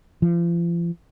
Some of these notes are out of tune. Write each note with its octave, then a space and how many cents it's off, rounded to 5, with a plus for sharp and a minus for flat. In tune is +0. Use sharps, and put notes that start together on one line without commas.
F3 -40